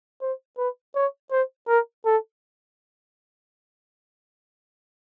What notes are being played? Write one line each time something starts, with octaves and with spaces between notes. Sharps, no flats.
C5
B4
C#5
C5
A#4
A4